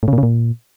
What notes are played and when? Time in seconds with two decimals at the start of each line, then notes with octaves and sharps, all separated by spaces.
0.03 A2
0.08 C#3
0.13 A#2
0.18 C#3
0.23 A#2